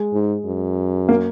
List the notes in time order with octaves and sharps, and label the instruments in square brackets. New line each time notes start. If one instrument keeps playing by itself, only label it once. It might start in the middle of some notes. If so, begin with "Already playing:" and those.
Already playing: [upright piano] G#3
[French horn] G#2
F#2
[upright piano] A#3